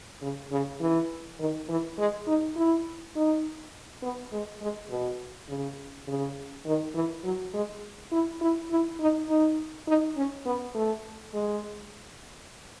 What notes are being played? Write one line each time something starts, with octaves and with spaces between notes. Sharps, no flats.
C#3
C#3
E3
D#3
E3
G#3
D#4
E4
D#4
B3
G#3
G#3
B2
C#3
C#3
D#3
E3
F#3
G#3
E4
E4
E4
D#4
D#4
D#4
C#4
B3
A3
G#3